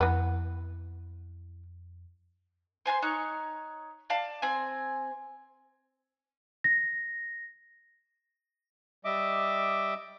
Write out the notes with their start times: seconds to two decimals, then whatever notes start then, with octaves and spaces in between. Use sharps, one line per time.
0.01 F2 E3 B3
2.86 C5 G#5 A5 C6
3.02 D#4 C#5 F#6
4.10 D5 F5 A5
4.42 C4 G#5
6.64 A#6
9.05 G3 D#5 E5 D6